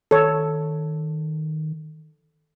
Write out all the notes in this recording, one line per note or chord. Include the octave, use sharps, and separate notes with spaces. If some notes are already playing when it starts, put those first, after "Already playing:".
D#3 A4 C#5